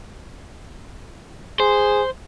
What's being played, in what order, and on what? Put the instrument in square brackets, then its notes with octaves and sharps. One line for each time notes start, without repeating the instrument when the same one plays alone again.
[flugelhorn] G#4 [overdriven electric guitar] C5